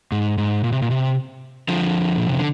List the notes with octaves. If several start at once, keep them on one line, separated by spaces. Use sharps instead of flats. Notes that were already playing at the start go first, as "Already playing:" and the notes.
G#2
G#2
A#2
C3
A#2
C3
D3 F3
A#2
C3
D3